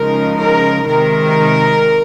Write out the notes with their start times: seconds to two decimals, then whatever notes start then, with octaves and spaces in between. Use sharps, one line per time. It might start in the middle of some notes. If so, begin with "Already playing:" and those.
Already playing: C#3 F3 G#3 D#4 A#4
0.37 A#4
0.86 C3 D#3 G#3 D#4 A#4